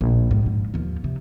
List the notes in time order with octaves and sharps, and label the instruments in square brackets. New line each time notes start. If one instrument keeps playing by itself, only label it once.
[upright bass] A#1
G#2
G#2
D#2 F3
C3